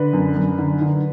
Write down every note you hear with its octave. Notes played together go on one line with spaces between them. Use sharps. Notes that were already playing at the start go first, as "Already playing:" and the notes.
Already playing: D3 B4
F#2
F#2
D3
D3